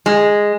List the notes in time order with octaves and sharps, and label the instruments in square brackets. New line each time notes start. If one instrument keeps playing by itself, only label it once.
[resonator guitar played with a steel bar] G#3